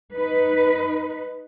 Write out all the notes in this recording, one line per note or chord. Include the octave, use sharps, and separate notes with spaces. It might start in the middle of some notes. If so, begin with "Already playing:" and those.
D#4 B4